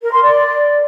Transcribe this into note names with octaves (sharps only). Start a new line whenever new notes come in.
A#4
C6
D5